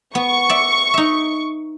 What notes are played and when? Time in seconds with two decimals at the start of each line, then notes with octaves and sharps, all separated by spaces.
0.15 B3 C#6
0.49 D5 E5
0.94 D#4 E5